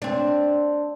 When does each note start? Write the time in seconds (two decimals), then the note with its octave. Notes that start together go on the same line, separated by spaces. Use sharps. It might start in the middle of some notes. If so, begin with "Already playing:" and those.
0.02 C4 D4